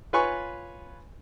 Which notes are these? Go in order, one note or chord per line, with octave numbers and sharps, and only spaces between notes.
F4 B4 C#5 G#5 B5 C#6